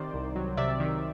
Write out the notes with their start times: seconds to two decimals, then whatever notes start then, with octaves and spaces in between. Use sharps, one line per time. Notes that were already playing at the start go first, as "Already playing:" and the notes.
Already playing: C3 D#3 C5 D5
0.14 C2
0.36 F#3
0.57 C3 D5 E5
0.80 D#3